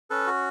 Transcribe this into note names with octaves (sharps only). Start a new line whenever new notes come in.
C#4 A4 B4
F#4